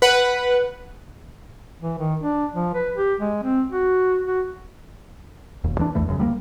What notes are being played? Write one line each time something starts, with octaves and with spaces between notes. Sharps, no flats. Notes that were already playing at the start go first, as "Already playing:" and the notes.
B4 F#5
E3
D#3
D4
F3
B4
G4
G#3
C4
F#4
F#4
E1 D#2
D#2 E3 F#3 D4
A#1 E2 E3 A3
G1 F#2 C#3
D2 G3 A3 A#3